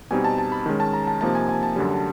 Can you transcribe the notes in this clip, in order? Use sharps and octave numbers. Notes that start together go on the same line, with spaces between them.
B2 G3 C4 D#4 G#5
A5
A5
B5
D#3 G#3 C#4
A5
A#5
A5
C3 F3 A#3 D#4 A5
G#5
G#5
A5
F#2 D3 G3